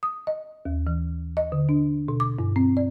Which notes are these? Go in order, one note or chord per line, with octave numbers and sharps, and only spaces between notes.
D#6
D#5
D#2
E3
D#5
D3
D4
B2
D6
G2
C4
D5